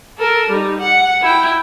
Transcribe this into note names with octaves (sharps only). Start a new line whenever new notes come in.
A4 A#4
G3 D#4
F#5
E4 G5